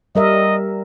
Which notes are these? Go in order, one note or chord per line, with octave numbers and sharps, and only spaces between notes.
G3 A#4 D#5 E5